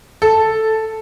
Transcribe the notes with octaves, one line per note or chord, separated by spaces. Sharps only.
A4